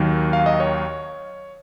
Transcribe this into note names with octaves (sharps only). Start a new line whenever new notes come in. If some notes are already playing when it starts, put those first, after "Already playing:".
Already playing: D#2 D#3 F#3
F5
D#5
C#5